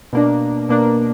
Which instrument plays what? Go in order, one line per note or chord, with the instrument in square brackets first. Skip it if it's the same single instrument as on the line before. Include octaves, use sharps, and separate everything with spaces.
[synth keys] B2 A#3 D4
B2 A#3 D4